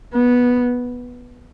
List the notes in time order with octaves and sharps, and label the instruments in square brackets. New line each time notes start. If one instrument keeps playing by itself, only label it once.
[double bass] B3